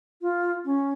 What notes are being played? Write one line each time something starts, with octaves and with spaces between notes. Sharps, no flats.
F4
C#4